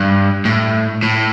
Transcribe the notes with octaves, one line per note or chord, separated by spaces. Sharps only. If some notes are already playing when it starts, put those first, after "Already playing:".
Already playing: G2
A2
A2